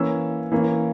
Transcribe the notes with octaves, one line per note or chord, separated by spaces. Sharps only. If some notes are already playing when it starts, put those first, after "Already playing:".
Already playing: E3 A#3 C#4 E6
E3 A#3 C#4